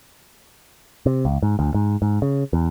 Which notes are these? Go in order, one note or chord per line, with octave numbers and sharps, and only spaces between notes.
C3
C#2
G#2
D2
G#2
G#2
C#3
E2